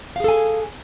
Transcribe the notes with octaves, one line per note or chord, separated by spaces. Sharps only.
G#4 A4 F5 G#5